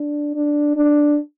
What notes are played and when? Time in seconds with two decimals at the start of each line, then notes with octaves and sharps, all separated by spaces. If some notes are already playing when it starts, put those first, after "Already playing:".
Already playing: D4
0.35 D4
0.76 D4